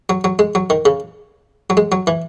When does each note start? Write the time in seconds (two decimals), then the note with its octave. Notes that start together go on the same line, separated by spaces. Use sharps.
0.09 F#3
0.24 F#3
0.39 G#3
0.55 F#3
0.70 D#3
0.85 C#3
1.70 F#3
1.77 G#3
1.92 F#3
2.07 E3